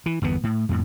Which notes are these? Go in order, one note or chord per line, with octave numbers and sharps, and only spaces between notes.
E3
G1 E2 B2 B3
A2
F2 A2